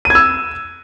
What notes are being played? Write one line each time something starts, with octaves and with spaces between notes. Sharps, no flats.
E6 G#6 D#7